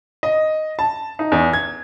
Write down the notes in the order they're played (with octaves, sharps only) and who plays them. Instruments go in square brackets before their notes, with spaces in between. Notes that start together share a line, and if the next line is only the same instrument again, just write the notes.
[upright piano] D#5
A5
D#4
E2
G#6